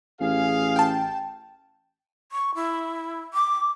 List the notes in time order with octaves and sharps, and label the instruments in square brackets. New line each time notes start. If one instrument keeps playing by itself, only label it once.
[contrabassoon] A1 [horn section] G#4 F5
[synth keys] G5 A5
[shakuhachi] C#6
E4
D6